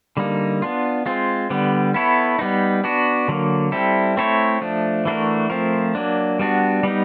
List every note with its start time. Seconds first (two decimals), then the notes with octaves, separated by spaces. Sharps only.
0.17 D3 G3 A#3 D#4
0.62 B3 D4 F4
1.06 G#3 C4 F4
1.50 D3 G3 B3
1.94 B3 E4 A4 C#5
2.39 G3 B3 D#4
2.84 B3 D4 F#4
3.28 D3 F#3 A#3
3.72 G3 C4 E4 A4
4.17 A3 C4 E4 A4 C#5
4.61 F3 A3 D4
5.05 E3 A3 D4 F#4 A#4
5.50 F3 A3 C4 F4 A#4
5.95 F#3 A#3 D4
6.39 G3 B3 D4 F#4
6.83 G3 B3 D#4